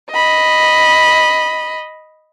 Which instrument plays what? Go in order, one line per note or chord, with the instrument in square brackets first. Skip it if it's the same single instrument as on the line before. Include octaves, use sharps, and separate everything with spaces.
[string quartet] D#5 B5